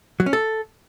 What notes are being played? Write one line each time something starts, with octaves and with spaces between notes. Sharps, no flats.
F#3
C#4
A4